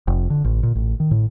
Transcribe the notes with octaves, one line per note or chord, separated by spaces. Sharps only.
F1
D3
A1
A#2
A1
D#3
A2